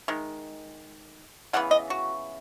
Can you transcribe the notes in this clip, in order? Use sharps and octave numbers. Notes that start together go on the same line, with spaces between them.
D#3 G#3
C#3 E3 B3 F#5
D#5
F#4